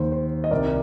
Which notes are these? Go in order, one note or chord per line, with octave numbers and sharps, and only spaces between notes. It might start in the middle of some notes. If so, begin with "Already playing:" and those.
Already playing: D#2 D#3 C5
C5
D#5
C2 C3 D#3 A#4 D5